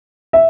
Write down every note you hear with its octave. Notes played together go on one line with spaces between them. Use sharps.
E5